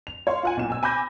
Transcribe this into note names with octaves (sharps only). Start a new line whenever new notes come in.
F7
C#5 F5 C6
F4 F#5 G#5
B1 A#2 E7
G#5 E6
G#5 B5 D6 G6 A#6